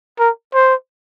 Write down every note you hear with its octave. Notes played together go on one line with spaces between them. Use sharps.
A#4
C5